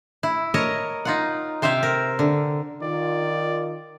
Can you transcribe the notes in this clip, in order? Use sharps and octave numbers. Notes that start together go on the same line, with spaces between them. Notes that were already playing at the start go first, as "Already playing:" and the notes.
E4
A#4 C#5 D#5 A5
D#4 F4 F#5
C3 C5 E5 F5 G5
A#4
D3
D#3 F4 D5